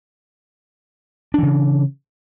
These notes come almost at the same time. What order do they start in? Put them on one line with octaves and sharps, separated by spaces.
D4 E3 C#3